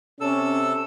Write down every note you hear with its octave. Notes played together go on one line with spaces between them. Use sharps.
C3 C#4 A4 E6